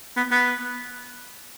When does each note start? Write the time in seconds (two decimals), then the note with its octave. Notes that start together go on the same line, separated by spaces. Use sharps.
0.17 B3
0.31 B3